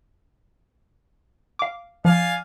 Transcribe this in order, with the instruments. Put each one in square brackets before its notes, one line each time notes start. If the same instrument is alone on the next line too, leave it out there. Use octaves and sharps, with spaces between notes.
[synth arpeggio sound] F5 D6
[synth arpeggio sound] F3 [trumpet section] D5 F5 G#5